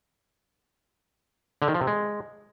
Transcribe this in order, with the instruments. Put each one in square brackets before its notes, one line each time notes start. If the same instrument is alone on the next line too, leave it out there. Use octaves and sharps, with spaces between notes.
[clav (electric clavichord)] D3
D#3
F3
C3
G#3